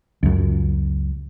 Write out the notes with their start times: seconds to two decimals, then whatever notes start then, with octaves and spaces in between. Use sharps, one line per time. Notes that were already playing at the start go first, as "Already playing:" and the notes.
0.23 C#2 F#2